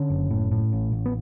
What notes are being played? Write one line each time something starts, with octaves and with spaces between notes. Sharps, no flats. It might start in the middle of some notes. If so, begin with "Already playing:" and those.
Already playing: D3 C#4
F#1
A2
A2
A1
A1
B3